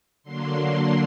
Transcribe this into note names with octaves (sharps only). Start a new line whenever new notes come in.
D3 F#3 A#3 D4 C6